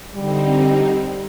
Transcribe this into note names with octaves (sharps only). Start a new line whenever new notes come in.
D3 G3 C4 D#4